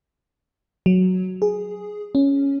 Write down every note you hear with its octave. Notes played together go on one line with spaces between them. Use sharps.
F#3
G#4
C#4